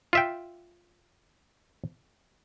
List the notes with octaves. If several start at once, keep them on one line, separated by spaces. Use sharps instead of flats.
F4 E5 G5